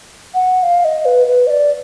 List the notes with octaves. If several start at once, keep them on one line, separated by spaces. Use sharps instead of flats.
F#5
F5
D#5
B4
B4
D#5
D5